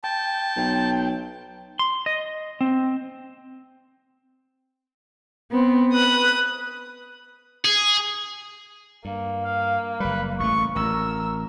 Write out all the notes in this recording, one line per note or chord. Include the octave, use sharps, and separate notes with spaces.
G5 A5
B1
C6
D#5
C4
B3 C4
B4 D#6 F#6
G#4
G2 A#3
F5
F#1 G3 B4
A1 A3 C#6
A1 A#4 E6